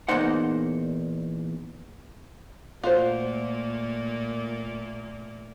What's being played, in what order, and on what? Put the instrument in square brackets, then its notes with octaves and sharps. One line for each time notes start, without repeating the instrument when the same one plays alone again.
[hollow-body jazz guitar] E2 A#2 A#3 D#4 C5 F#5
[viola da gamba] A#2 A3 A#3 [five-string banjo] F4 F#4 C5